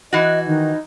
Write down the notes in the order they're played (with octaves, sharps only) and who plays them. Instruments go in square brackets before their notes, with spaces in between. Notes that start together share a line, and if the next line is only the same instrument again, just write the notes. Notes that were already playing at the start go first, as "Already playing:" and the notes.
[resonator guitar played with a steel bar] E3 F#4 [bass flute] D#5
[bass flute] D#3 [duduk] D#4